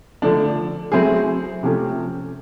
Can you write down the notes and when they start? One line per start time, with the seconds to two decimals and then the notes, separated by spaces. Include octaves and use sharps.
0.22 D3 F3 A3 D4
0.92 F#3 A3 C4 E4 G#4
1.63 C3 F3 A3 C#4